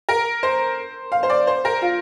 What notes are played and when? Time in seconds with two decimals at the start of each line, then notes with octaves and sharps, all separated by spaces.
0.09 A#4
0.43 C5
1.12 F5
1.23 C5
1.30 D5
1.47 C5
1.65 A#4
1.82 F4